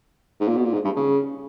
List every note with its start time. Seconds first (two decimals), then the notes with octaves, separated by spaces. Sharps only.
0.40 G#2
0.48 A#2
0.57 B2
0.65 A#2
0.73 G#2
0.85 G2
0.96 C#3